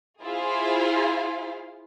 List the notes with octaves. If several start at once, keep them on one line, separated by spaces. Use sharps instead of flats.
E4 F4 G#4 C5 F5